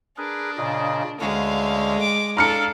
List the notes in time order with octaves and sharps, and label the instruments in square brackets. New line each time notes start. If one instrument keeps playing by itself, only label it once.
[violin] D4 [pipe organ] G#4 A#4 B4
[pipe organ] A#2 C#3 D#5
[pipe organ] D2 D3 C#4 [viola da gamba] G#3 [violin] F5
[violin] D6
[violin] D4 A4 [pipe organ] F5 [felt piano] A#5 F6 C#7